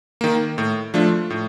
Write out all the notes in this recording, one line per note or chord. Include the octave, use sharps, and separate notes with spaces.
D#3 A#3
A2
F3 A3 D4 F4
A2